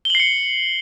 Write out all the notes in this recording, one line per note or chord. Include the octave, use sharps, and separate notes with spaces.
C7 C#7 F#7 G7